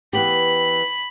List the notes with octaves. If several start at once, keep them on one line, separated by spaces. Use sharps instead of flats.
E3 B3 G4 B5